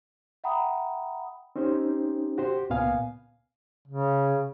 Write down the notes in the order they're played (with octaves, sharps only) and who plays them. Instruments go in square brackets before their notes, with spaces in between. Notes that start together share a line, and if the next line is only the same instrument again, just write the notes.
[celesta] E5 F#5 G5 A#5 B5 D#6
[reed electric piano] C4 C#4 D#4 G4 C5
F#4 G4 C5
C#2 A#2 B3 F5 G#5
[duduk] C#3